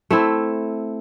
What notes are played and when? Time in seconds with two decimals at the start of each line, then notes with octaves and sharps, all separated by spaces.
0.11 A3 C4 E4